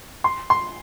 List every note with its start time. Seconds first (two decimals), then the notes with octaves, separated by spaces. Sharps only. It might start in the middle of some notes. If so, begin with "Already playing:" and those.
0.24 C6
0.50 C6